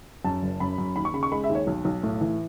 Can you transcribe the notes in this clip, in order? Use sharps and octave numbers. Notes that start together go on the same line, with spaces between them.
F#2 A5
F#1
F#2 B5
F#2
D#2 B5
C#6
C#3 B5
C#6
G#3 B5
E5
D#2
C#5
B1
B1
A2
E3